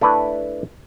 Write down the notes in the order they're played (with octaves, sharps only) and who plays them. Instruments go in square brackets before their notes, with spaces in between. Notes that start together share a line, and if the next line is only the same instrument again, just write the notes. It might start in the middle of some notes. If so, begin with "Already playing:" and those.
[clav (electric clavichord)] A3 D4 E4 B4